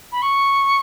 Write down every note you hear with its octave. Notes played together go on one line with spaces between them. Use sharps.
B5
C#6